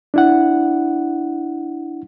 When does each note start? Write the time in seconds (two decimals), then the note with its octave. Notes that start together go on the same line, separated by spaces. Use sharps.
0.14 D4 E4 F#5